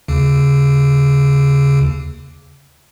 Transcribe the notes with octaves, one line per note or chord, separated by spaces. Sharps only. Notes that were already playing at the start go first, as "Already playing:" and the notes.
D#2 C#3